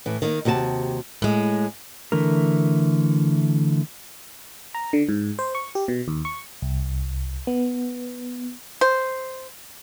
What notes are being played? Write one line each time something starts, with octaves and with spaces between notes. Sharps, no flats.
A2 E3
D#3 A#3
D#2 C3 F#4 G#4 A5
A2 G#3
D3 E3 A3 A#4
A#5
D3
G#2
C5
C#6
G4
B2
D#2
C#6
C2
B3
C5